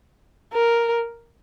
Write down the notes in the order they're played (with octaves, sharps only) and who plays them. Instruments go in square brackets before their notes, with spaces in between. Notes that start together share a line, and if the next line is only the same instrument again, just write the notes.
[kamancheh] A#4